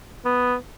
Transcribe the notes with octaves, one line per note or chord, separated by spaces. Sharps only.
B3